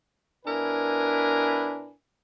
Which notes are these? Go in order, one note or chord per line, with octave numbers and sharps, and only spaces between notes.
B2 D4 E4 A#4 B4 G#5